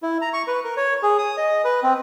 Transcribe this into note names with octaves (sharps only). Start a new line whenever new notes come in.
E4
A#5
C#6
B4
A#4
C#5
G#4
D#6
D#5
B4
C4